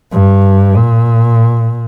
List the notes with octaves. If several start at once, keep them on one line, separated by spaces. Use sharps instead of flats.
G2
A#2